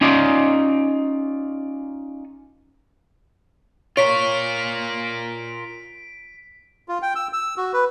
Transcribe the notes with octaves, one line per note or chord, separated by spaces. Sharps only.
C#4 D#4 F4 D5
F4 A#4 C#5 B6 D7
F4
G5
E6
E6
F#4
B4